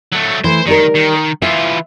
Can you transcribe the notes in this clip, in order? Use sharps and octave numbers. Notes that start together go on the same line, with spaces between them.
F#3 A3
E3 A3 C5
D#3 G3 D#4 A#4
D#3
E3 F4 E5